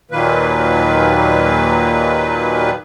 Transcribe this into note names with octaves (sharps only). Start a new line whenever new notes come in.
D#2 A#2 D#3 F#3 A#3 B4